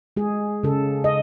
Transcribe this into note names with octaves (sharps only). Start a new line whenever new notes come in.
G#3 G#4
C#3 A4
D#5